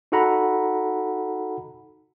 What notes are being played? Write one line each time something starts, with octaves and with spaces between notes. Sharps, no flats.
D#4 F#4 A4 F#5 A#5 B5